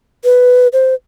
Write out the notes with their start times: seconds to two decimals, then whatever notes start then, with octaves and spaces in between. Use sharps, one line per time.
0.24 B4
0.73 C5